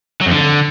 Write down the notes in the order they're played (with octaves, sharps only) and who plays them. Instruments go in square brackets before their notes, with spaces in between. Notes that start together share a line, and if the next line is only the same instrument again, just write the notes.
[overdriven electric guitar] F#3
F2
D3